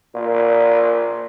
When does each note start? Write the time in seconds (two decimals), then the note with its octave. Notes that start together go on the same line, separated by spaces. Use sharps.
0.15 A#2